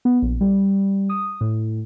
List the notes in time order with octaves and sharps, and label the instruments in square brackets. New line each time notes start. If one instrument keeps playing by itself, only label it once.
[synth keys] B3
A#1
G3
D#6
A2